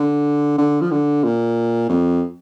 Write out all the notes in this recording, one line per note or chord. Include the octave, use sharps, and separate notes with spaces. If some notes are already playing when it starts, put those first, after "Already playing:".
Already playing: D3
D3
F3
D3
A#2
F2